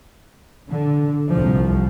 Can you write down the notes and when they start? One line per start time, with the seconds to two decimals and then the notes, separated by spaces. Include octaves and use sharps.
0.71 D3
1.33 C2 F3